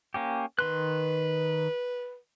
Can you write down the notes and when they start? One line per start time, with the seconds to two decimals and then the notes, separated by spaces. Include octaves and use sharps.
0.14 A#3 C#4 G4
0.59 D#3 B4 C6 F#6